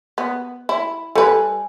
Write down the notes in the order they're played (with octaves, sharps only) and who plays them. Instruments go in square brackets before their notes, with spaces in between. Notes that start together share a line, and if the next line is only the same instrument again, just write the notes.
[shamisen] B3
E4
[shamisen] G3 B4 [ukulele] A4 G#5